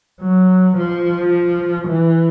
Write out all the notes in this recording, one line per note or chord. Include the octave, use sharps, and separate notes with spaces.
F#3
F3
E3